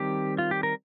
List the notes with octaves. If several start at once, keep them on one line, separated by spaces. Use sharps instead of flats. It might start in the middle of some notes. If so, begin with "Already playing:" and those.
Already playing: D#3 G3 C4 G4
F4
G4
A#4